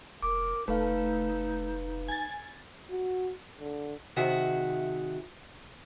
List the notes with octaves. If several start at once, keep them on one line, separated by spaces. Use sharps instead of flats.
F1 A#4 D6
F1 A3 D#4 B4 F5
G#5 A6
F#4
D3
C3 D#3 F#4 G#4 E5